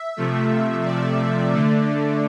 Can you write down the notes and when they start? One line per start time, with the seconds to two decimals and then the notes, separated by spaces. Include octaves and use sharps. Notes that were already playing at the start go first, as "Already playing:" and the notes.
Already playing: E5
0.17 C3 F3 A3
0.85 D5
1.54 D3 A3